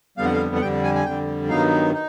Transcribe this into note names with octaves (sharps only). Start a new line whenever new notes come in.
F2 D3 G3 B3 F5
F#5
F5
F#5
F2 D3 G3 G5
G#5
G#5
F2 D3 G3 G5
G2 D#3 F#3 B3 D#4 F5
D#4